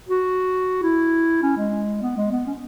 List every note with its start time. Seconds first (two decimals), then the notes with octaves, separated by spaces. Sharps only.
0.09 F#4
0.83 E4
1.43 C#4
1.57 G#3
2.02 B3
2.17 G#3
2.32 B3
2.47 C#4